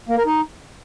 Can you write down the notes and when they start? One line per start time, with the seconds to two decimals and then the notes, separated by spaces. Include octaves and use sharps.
0.09 A#3
0.17 A#4
0.26 D#4